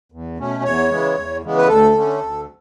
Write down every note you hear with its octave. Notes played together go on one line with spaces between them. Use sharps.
E2
B2 A3 C#4
E2 C#5
C#3 E3 G#3 B3
E2
C#3 E3 G#3 B3
B4
D2 A4
D3 A3 C#4
D2